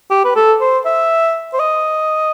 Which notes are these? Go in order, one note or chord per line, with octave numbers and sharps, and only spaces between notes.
G4
B4
A4
C5
E5
C5
D#5